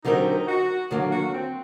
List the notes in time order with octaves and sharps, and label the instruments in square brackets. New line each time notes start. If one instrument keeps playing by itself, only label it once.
[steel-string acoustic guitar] D3 F#3 C4 G4 A#4 [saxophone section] D#4
[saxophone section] F#4
[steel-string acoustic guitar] D#2 D3 F#3 A#3
[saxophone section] F#4
C4